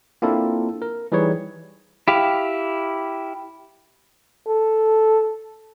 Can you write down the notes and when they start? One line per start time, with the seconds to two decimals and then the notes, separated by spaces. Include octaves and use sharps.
0.22 A#3 C4 D4 E4 F4 A4
0.82 A#4
1.12 E3 G3 D#4 G#4 B4 C#5
2.08 E4 G4 F5
4.48 A4